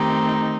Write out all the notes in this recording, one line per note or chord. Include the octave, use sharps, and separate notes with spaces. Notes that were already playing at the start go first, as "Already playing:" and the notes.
Already playing: D#3 A3 C4 D#4 G4